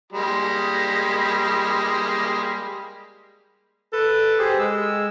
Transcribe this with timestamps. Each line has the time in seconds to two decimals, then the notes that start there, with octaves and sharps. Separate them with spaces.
0.12 G3 G#3 A#3
3.93 A4 B4
4.39 G4 G#4 C5
4.59 G#3 E6